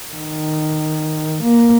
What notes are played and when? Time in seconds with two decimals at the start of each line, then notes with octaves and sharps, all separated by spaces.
0.13 D#3
1.43 A#3